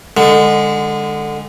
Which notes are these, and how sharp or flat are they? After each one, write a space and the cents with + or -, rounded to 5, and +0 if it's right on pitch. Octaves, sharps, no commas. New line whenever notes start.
D3 +5 G#3 -25